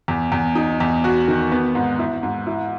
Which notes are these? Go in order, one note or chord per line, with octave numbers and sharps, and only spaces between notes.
E2
E2
D#4
E2
F#4
D#3
B3
G#2
E4
G#2
E4